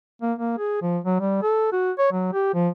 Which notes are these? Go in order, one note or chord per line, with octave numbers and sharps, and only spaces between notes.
A#3
A#3
G#4
F3
F#3
G3
A4
F#4
C#5
F#3
G4
F3